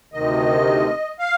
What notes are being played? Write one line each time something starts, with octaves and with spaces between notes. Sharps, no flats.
D2 C3 D#3 D#5
F5